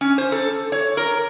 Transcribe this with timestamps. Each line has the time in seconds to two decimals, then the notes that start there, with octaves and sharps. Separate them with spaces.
0.01 C#4
0.18 C5
0.32 A4
0.72 C#5
0.97 A#4